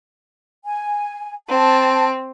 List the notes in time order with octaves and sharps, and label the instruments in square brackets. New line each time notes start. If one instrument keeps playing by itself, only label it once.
[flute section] G#5
[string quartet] C4 [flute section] A5